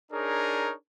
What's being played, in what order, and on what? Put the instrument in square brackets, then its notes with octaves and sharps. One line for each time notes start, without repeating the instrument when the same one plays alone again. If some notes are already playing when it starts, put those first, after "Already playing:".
[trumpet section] D4 D#4 G#4 A#4 C#5